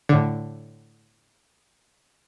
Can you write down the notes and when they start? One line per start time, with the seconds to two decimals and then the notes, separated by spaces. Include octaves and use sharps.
0.09 A2 D3